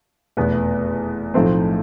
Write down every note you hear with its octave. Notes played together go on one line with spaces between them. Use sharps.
F1 E2 B2 B3
B1 A2 F3 A3 C4